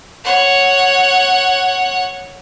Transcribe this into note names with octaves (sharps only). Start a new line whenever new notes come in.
C#5 F#5